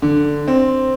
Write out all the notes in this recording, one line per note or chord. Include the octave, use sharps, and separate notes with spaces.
D3
C4